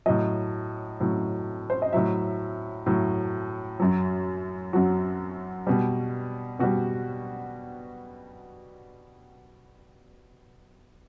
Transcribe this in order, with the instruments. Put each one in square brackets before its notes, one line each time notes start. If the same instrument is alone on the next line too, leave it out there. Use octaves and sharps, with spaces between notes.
[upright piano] A2 F#3 D#5
A2 F#3
C5
D#5
A2 F#3 E5
A2 F#3
F#2 F#3
F#2 F#3 F#4
B2 G3
B2 G3 F#4